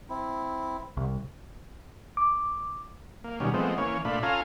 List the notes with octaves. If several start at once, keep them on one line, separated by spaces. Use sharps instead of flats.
C4 E4
C2
D6
A#3
B2 D#3 G3 C#4
F3 G#3 A3 B3 C4
E3 A#3 C#4 C#5
A#2 A3 D4 F4 B5
C#4 F4 A4 F5 G#5 A#5